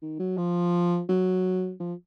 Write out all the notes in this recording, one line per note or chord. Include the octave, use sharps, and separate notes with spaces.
D#3
F#3
F3
F#3
F3